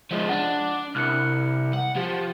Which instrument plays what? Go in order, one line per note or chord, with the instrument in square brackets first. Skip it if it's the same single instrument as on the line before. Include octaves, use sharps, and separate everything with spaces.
[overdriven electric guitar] F3 G#3
[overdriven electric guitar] D4 [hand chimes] F#5
[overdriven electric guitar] C2 [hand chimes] F6 F#6 C#7
[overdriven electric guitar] F#5
[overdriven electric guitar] F3 [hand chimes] G4